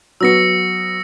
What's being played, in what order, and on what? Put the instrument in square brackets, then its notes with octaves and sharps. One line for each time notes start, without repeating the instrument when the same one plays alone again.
[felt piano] F#3 B3 [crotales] E6 A#6 C#7